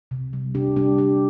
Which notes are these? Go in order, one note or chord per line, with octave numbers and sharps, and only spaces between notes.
C3
G3
C3 D4 G4
G3 D4 G4
G3 D4 G4